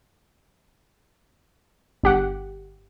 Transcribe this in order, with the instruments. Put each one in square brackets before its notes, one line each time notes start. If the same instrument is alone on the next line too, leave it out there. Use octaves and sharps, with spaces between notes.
[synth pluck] G1 G4 F#5